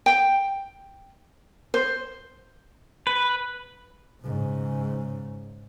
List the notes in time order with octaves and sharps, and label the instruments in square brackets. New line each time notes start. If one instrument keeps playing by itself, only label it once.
[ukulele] G5
C5
[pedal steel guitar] B4
[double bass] G#2 C#3